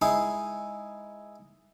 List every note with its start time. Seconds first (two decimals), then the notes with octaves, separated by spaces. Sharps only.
0.02 G#3 D#4 E4 G#4